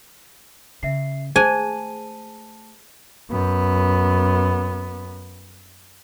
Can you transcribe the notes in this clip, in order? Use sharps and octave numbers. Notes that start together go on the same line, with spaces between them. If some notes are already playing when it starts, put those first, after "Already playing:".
C#3 E5 C7
A3 G#4 C5 G#5 A5 D#7
F#2 B3